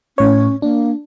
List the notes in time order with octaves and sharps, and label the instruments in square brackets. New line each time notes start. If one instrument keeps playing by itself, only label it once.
[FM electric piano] A2 C#5 [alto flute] C#4
[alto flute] A#3 [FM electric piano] D4